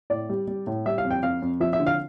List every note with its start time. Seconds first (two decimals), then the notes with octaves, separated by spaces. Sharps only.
0.10 A2 D5
0.30 G3
0.47 G3
0.67 A2
0.86 G3 E5
0.98 F5
1.04 F2
1.11 G5
1.23 F2 F5
1.42 F2
1.60 F3 E5
1.73 E5
1.80 D3
1.87 F5